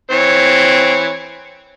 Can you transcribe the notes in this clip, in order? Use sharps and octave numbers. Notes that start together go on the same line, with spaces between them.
E3 C4 C#5